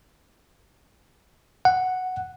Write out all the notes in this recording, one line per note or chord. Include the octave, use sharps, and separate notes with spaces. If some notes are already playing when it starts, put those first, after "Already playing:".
F#5